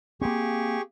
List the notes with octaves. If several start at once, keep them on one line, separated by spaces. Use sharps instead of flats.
A#3 C4 G4 G#4 C#6